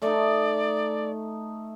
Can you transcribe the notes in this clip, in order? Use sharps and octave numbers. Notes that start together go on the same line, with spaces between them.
A3 D#4 D5